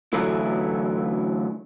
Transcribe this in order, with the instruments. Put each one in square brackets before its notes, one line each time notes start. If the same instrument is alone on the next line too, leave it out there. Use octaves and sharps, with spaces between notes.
[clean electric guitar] D3 E3 F#3 A3 E4